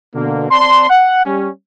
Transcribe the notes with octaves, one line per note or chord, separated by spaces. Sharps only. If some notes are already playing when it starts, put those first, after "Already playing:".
B2 D3 A#3
C4 D5 A5 C6
F#5
G3 C#4